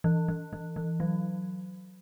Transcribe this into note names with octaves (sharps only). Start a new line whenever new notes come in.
E3
E3
E3
E3
F#3